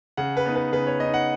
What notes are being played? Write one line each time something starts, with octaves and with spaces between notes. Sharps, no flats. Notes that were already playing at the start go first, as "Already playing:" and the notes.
C#3 F#5
B4
B3 D#4
B4
C#3 B4
C#5
B3 D#5
D#4
F#5